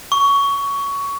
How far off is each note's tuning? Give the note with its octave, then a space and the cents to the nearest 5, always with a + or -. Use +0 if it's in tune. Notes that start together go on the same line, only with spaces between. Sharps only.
C#6 +15